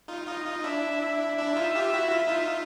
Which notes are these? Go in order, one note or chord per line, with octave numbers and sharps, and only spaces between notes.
D#4 F4
D#4 F4 D#5
D#4 F4
D4 E4 E5
E5
D4 E4
D#4 F4
F4 G4
E4 F#4
F4
E4
D#4 F4